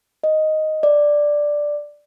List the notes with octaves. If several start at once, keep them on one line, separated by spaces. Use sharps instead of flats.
D#5
D5